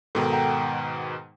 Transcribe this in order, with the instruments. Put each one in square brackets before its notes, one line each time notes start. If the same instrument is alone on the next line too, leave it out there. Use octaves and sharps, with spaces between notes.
[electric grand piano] G#2 B2 D#3 [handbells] A4 G5 A#5
[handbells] F#5 G5 A#5